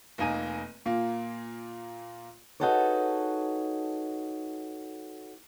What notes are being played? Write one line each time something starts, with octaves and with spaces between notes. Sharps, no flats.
F1 A#3 D#4 G#5 D#7
A#2 A#3
D#4 F#4 G#4 A4 B4 C#5